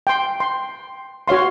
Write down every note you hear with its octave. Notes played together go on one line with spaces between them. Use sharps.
G5 C6
C6
F#4 C#5 F5 C6